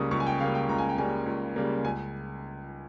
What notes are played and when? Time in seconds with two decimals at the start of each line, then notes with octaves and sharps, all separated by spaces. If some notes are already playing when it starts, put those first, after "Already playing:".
Already playing: C#2 C#3 G3 A#3 C#6 D#6
0.11 C#2 C#6
0.20 G#5
0.26 G5
0.40 C#3 G3 A#3 F5
0.55 G5
0.69 C#2 A#5
0.78 G#5
0.89 G5
0.98 C#3 G3 A#3 G#5
1.26 C#2
1.56 C#3 G3 A#3
1.84 C#2 G#5